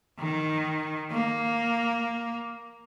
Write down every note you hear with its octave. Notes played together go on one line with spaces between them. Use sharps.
D#3
A#3